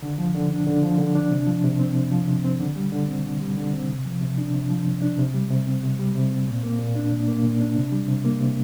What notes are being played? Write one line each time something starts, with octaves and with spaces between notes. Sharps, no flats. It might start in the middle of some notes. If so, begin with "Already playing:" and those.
D3
F3
D3
D4
D3
F3
D3
D4
C3
F3
C3
C4
C3
F3
C3
C4
D3
G3
D3
C4
D3
G3
D3
C4
C3
F3
C3
D4
C3
F3
C3
D4
C3
G3
C3
C4
C3
G3
C3
C4
A#2
A#3
A#2
D4
A#2
A#3
A#2
D4
C3
G3
C3
A#3
C3